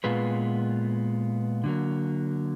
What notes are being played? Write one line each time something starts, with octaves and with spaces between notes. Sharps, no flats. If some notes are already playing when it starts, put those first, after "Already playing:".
A#2 G#3 B3 F4 B4
D3 F#3 A#3